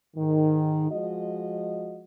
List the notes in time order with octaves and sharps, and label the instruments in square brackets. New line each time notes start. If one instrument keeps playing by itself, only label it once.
[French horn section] G#2 D#3
F3 G#3 F#4 D#5